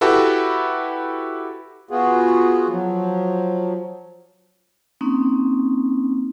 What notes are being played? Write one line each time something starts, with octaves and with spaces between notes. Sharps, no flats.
E4 F#4 G4 A4 B4
B3 F4 F#4 G#4
F3 F#3
A#3 C4 C#4 D#4